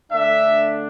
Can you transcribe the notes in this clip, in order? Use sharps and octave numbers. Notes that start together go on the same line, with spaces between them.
D3 A3 D4 E5